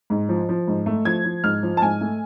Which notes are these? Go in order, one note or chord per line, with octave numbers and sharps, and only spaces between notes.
G#2
F3
F3
G#2
A3
F3 G#6
F3
G#2 F6
F3
A5
G#2 G#5
A3